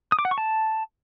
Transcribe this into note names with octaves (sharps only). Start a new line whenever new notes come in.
D#6
D6
F#5
C#6
A5